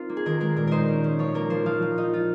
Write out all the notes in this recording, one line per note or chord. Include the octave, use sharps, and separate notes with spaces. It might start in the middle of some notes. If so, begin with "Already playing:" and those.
Already playing: C4 D#4 F4 A#4 C5
A#3
G#4
D#3 A#4
G#3 A#4
A#2 A#4
D#4 A#4 C5
C#4
C#4
F3 C#5
A#3 A#4
F3 C5
F3 F5
F3
D#4
F4